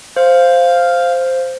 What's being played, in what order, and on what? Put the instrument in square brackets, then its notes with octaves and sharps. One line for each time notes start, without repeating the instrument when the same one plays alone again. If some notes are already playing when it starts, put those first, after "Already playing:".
[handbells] C5 [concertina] F5